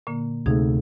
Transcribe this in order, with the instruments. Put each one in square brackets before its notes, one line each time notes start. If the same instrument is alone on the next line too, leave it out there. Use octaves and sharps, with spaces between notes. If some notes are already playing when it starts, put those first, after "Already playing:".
[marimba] A#2 D3 A#3
[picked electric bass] D2 C3 A3 [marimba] D#4 G#4